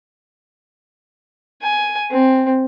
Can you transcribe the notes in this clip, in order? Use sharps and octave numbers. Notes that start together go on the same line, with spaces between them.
G#5
C4